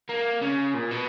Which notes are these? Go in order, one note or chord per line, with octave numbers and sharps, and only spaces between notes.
A#3
C#3
A#2
B2